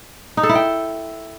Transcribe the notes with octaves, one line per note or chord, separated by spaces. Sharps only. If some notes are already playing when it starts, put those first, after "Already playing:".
D#4
A4
E4
G5